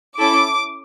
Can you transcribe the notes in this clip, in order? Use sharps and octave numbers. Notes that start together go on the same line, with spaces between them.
C#4 E4 A4 D6